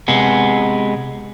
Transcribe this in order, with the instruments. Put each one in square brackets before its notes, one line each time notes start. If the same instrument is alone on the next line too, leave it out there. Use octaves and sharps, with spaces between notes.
[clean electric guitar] C3 G#3 B3